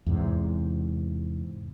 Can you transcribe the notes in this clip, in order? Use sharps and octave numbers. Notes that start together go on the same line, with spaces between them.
E2 G#2 C3